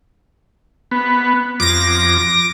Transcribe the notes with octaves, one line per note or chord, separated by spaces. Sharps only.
B3
F2 D6 A#6